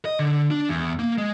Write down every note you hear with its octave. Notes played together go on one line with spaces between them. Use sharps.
D#5
D3
D4
E2
A#3
G#3